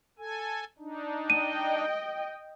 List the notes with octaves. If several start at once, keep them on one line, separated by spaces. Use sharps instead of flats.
A4 G#5
D4 D#4
D#5 G5 D#7